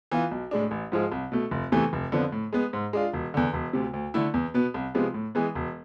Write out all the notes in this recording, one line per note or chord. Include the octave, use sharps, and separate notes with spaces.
E3 B3 F4
B1
A2 G#3 D4
A1
G#2 F3 G#3
C2
B2 A3
F1
E2 C3 E3 A3
F1
F2 D3 F3 B3
A2
G#3 B3
G#2
G#3 D4 F4
E1
E2 D3
E1
D2 C3
D2
D3 A3 E4
E2
B2 B3
C2
C3 F3 G#3 B3
A2
E3 G#3 B3
E1